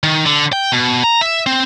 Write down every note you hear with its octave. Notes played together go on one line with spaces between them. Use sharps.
D#3
D3
G5
B2
A#5
E5
C4